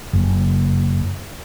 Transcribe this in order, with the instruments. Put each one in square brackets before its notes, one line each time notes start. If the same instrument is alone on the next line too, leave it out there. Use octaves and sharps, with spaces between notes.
[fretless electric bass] F#1